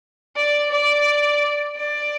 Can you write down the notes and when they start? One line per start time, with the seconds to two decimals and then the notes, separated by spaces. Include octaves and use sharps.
0.36 D5
0.71 D5
1.76 D5